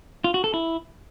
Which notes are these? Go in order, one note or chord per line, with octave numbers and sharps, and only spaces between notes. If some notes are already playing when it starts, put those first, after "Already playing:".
F4
F#4
A4
E4